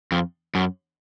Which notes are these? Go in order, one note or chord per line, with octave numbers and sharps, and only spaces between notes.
F2
F#2